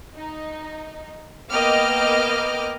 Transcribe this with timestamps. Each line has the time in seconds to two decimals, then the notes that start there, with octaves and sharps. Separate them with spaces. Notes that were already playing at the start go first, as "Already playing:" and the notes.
0.15 D#4
1.51 A#3 B3 D#5 G5 D6 F6